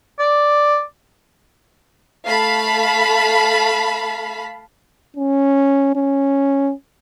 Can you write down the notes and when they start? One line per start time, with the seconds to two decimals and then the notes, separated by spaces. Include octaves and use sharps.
0.19 D5
2.26 A3 F5 A5 B5 B6
5.17 C#4
5.96 C#4